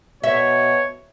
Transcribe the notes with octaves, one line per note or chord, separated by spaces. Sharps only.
B2 C#5 E5